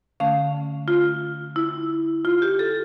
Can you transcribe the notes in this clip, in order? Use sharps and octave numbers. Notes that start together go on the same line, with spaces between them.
D3 A3 C#4 F5
F4
E4
F4
G4
A4